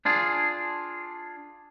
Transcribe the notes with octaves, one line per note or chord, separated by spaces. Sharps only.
D4 F4 G#4